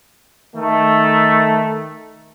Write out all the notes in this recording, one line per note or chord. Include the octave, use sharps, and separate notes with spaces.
D#3 A3